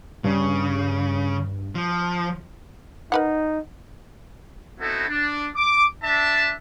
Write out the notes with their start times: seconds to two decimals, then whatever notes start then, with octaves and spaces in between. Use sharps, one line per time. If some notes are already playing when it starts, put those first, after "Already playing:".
0.24 G2 C#3
1.75 F3
3.12 D#4 A#4 B4 F#5
4.80 B3 C4 D#4 E4 F#4 A4
5.08 D4
5.56 D6
6.03 D4 E5 A5